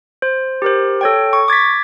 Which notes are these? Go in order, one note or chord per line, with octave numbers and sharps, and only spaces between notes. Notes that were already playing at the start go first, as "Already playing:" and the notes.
C5
G4 A#4 C5
A4 C#5 G5
C#6
D6 G#6 A6 B6